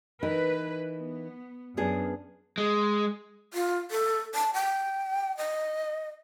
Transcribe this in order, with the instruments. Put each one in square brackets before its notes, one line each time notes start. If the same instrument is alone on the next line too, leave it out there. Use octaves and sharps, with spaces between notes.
[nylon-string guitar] E3 D#4 A#4 [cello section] B4
[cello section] B3
[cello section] F#2 [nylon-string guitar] B3 D4 G#4
[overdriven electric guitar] G#3
[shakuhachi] F4
A4
A5
G5
D#5